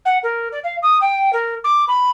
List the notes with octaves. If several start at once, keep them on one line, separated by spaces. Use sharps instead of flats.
F#5
A#4
D5
F5
D#6
G5
A#4
D6
B5